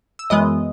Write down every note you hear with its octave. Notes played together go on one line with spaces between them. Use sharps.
E6
F#2 E3 G#3 B3 D#5 D#6